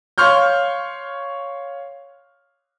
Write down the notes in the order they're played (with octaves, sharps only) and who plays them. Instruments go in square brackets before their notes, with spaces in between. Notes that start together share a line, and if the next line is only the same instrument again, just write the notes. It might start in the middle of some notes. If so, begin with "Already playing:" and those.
[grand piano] C#5 F5 C6 C#6 F6 G6